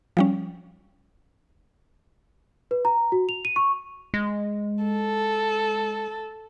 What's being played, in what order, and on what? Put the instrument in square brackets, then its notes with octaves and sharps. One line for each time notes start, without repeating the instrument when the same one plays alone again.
[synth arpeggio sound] F3 G3 C#4
[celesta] B4
A#5
F#4
F7
D#7
C#6
[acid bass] G#3
[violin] A4